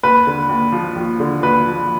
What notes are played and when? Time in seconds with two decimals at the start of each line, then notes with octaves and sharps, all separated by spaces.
0.03 D#2 B4
0.27 D3
0.49 D#2
0.72 F3
0.96 D#2
1.20 D3
1.43 D#2 B4
1.66 F3